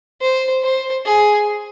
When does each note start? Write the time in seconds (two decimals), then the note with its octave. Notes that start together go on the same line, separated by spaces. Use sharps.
0.21 C5
0.63 C5
1.05 G#4